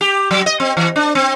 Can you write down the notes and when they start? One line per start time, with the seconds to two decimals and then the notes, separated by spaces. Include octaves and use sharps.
0.01 G4
0.31 F#3
0.46 D#5
0.60 C4
0.77 E3
0.96 D4
1.15 C4